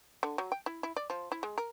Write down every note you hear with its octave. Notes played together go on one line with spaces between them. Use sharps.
D3
F#3
G5
E4
E4
D5
F3
E4
G#3
A#4